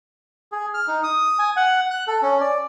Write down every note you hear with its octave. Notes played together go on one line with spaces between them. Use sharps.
G#4
F6
D#4
D#6
G#5
F#5
F#6
A4
C#4
D5